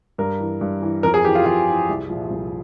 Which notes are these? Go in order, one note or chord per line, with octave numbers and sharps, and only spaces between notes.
G2 A#4
E3
G2
E3
F2 A#4
G#4
E3 G4
F4
F2 F4
E3
C2
A#2 F3
C2